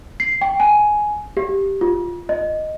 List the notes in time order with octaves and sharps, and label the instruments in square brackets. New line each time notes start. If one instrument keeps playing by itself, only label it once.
[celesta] C7
G5
G#5
G4
F4
D#5